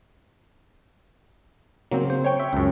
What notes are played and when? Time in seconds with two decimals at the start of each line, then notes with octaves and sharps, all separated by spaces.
1.92 C#3 F#3 A#3 C4
2.10 C5
2.24 C#5 G5
2.40 E5
2.53 C#2 F#2